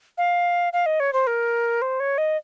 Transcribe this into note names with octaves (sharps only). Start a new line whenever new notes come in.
F5
F5
D#5
C#5
C5
A#4
C5
C#5
D#5